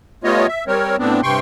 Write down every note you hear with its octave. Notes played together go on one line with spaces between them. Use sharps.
G3 A3 B3 F4 C#5 D#5
E5
G3 C4 A#4 C#5
A2 B3 C4 D4
G2 C3 G5 C6 C#6